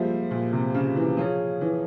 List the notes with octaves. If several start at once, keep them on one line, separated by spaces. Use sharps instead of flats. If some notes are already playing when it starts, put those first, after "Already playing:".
Already playing: F3 G3 G#3 A#3 F4 C5 E5
A#2
C3
C#3
E3
F3 G#4 C#5 F5 G#5
E3